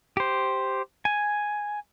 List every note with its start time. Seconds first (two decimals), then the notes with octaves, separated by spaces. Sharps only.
0.17 G4 C5
1.05 G#5